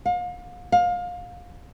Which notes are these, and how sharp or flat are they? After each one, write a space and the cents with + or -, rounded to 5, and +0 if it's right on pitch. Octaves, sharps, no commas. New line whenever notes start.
F5 +40
F5 +25